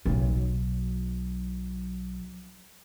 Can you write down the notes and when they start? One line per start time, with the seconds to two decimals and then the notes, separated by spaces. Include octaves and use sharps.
0.06 B1 F#3